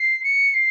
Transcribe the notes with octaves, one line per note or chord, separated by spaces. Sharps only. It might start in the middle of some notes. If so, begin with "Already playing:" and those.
Already playing: C7
C#7
C7